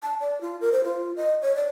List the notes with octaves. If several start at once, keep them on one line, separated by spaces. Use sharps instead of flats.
A5
D5
F4
A#4
C5
F4
D#5
C#5
D5